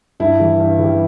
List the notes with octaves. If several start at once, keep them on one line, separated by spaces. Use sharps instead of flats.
G2 E4
E3 G3
G2
E3 G3